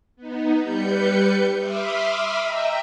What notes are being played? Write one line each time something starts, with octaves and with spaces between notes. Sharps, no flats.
B3 D#4
G3 B4 G6 C#7
E5 B5 C6 D6 D#6 F6
D#5 E5 G5 A#5